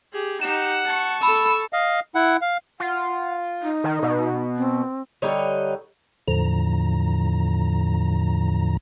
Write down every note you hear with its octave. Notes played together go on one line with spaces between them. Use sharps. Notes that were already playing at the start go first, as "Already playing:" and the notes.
G4 G#4
D#4 G4 F#5 E7
A5 C#6
A4 B5 E6
D#5 F5
E4 F#5
F5
F4 F#5
D#4
D#3
B2
C4
D3 G3 D#4 C#5
E2 A2 D3 F3 A#5